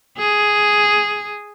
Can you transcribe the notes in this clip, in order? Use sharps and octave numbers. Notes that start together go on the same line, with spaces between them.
G#4